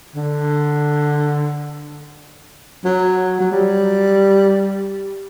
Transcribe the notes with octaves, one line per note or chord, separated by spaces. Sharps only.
D3
F#3
F#3
G3